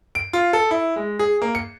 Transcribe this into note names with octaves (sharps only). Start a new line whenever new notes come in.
D7
F4
A4
E4
G#3
G#4
A#3
C#7